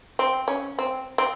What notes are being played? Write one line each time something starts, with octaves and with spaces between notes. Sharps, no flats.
C4
C#4
C4
C4